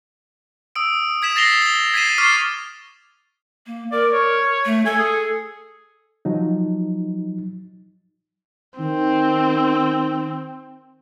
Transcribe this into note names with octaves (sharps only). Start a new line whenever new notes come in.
D#6 E6 D7
D#6 G#6 B6 E7 F#7
A6 A#6 C7 F7 G7
F7 G7
G#6 B6 C7 D#7 E7
C#6 D6 F6 A6 C7
A#3
A#4 D5
C#5
A3
A4 G#5
G#4
F3 F#3 D#4
D#3 C4